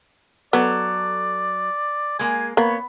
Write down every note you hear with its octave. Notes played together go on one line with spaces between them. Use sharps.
F#3 B3 A4 D5
G#3 A#3 G#5
A#3 B3 C#5